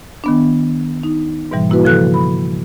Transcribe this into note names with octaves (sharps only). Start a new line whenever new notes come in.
D#3 B3 D4
D#4
G#2 B2 E3 G3
A#3 E4 F#4 B4
C#3 F3 A4 F#6
B5